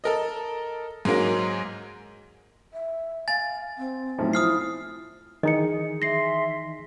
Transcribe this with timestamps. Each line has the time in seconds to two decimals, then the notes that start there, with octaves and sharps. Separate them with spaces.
0.04 A4 A#4 D#5
1.05 G#2 F#3 G#3 A#3
2.73 E5
3.28 F5 G#5 A6
3.78 C4
4.19 B1 A2 F3
4.33 F3 E4 D#6 F6 C7
5.43 D#3 E3 D#4 G#4 D#5 C#7
6.02 E5 C6 A#6 C7